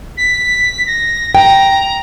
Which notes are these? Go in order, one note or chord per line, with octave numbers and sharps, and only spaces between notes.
B6
A#6
G5 A#5